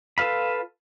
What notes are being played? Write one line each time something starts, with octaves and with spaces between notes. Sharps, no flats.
F4 A4 B4 F5 B5